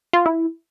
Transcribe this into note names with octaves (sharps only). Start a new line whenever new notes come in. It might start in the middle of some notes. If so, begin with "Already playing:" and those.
F4
E4